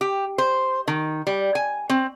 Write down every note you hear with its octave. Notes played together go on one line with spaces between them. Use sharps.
G4
C5
D#3
G3
G#5
C4